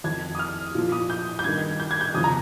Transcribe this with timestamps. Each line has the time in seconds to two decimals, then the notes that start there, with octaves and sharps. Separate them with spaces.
0.04 F2 D#3 G#6
0.35 D#6
0.39 F6
0.75 A#2 F3
0.92 D#6
1.10 G6
1.39 G6
1.44 G2 D#3 G#6
1.80 G6
1.91 G#6
2.01 G6
2.14 F2 C#3 F3 D#6
2.24 A#5